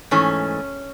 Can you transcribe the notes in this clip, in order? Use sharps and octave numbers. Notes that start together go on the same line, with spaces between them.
G#2 E3 A3 C#4